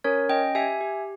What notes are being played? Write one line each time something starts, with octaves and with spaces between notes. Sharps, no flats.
C#4 A#4 C#5
C#4 D#5 G5
G4 E5 G#5
G4